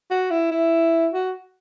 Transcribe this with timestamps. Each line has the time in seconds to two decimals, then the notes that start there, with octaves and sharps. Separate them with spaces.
0.11 F#4
0.31 E4
0.51 E4
1.13 F#4